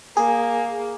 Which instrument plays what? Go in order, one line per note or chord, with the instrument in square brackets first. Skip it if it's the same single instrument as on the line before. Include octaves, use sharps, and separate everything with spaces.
[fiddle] A#3 [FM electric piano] G#4